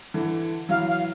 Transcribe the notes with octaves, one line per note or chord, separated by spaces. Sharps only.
D3 E3
E3 F#3 F5
F5